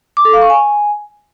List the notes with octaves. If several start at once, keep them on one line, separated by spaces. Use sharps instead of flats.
D6
A4
F5
C#6
G#5